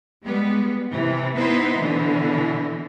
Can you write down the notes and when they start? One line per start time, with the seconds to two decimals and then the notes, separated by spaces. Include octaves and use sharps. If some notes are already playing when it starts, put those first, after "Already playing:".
0.23 G3 G#3 B3
0.91 C3 E3
1.36 B3 D#4 E4 B4 C5
1.78 B2 D3 E3